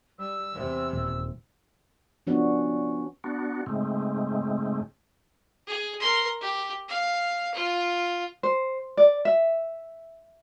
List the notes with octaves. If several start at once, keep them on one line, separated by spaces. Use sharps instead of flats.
G3 E6
E2 C3
D#1
F3 B3 C#4 D4 F#4
B3 D4 F#4
G#2 C#3 G#3 A3 C4
G#4
A#4 C6
G4
F5
F4
C5
D5
E5